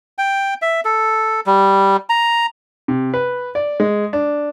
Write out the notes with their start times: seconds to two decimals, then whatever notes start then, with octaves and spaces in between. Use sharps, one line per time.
0.18 G5
0.62 E5
0.85 A4
1.46 G3
2.09 A#5
2.88 C3
3.14 B4
3.55 D5
3.80 G#3
4.13 D4